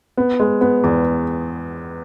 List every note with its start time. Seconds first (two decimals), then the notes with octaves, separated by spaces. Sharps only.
0.17 B3
0.40 G#3
0.61 B3
0.84 E2